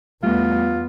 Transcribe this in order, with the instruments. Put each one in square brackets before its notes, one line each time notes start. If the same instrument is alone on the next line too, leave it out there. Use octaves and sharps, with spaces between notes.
[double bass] E2 B3 [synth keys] G3 A3 [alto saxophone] F4